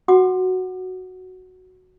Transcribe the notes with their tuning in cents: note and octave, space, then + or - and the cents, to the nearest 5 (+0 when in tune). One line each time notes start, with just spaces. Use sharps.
F#4 +0 F#5 +0 D6 +35